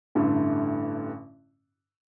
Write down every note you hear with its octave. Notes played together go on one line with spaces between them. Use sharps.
A1 G2 D3 A3 E4